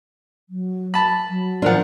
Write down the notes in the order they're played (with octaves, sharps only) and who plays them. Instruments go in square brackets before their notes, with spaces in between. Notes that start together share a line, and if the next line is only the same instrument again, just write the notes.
[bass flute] F#3
[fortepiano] A5 B5
[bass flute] F#3
[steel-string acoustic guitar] F3 D4 [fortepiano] F4 A#4 F#5